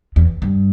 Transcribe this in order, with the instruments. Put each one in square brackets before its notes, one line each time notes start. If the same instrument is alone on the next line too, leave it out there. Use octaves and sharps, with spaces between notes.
[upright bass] E2
G2